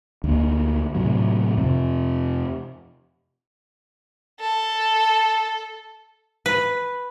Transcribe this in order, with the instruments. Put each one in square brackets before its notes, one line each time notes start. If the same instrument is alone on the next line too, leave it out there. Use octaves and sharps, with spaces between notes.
[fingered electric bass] D2 A#3
A2 C3 F#3
F2 C3
[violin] A4
[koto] B4